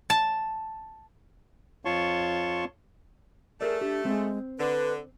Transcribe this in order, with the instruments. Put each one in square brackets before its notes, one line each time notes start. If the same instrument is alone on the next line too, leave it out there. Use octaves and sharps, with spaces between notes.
[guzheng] A5
[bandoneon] F2 F4 C#5 A5 C6 C#6
[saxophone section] A3 [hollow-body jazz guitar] G#4 A#4 D5
[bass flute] D4 [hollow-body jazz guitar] G4
[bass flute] G#3 [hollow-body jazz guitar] C4
[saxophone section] D3 [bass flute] B4